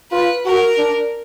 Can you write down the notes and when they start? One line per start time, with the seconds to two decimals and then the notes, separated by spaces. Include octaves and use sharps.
0.11 F4 B4
0.45 F#4 A#4
0.78 D4